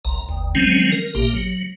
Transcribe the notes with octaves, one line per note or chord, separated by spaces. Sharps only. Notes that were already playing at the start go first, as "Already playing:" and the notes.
F#1 C2 A#5
G1 D#2
D#3 F3 F#3 G#3 C4 C#4
A#4
A1 A#2 A#3 G4
F#3